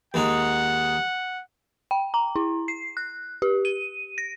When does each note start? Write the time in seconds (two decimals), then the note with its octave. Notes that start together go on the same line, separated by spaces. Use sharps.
0.14 D#2 G#3 D#4 F#5
1.91 G5
2.14 A#5
2.36 E4
2.68 C7
2.97 F#6
3.42 G4
3.65 D#7
4.18 A#6